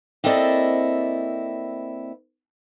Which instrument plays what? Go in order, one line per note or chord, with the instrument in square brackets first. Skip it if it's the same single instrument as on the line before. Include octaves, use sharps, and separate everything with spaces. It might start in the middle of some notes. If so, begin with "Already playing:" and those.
[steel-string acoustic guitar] A#3 C4 E4 A4 D5 D#5